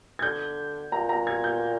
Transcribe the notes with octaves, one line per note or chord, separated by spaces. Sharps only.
G#6
D3 G6
A#2 A#5
A#5
G#6
G6